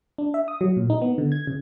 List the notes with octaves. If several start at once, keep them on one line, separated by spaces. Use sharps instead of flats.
D4
E5
D#6
F#3
A#2
D#4
B3
D3
G#6
C#3